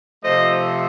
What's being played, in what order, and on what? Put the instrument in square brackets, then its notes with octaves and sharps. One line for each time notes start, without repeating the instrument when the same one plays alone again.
[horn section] C3 F3 A3 C5 D#5